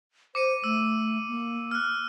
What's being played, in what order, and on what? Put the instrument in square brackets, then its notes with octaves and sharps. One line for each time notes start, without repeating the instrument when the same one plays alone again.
[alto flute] C5 [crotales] D6 C#7 D#7
[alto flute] A3 [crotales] E6
[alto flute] A#3
[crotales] F6 F#6